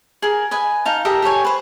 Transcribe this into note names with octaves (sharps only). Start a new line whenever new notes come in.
G#4 A#4
B4 D#5 G#5
D#4 F5 A5
G4 A4 A#4 D#5
G4 A4 C#5 G#5
B4 C5